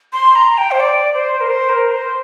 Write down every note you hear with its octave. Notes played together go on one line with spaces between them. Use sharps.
C6
A#5
G5
C5
D5
C5
A#4
C5
A#4
C5